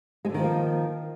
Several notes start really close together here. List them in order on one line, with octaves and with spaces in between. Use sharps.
G#3 D3 D#3 F3 A#3